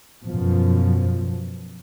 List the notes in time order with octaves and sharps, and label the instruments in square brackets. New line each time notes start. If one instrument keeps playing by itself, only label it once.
[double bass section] F#2 B2 F3